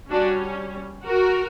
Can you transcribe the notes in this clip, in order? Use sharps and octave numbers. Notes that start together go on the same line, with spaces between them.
G3 C#4 D4 F#4
F#4 A#4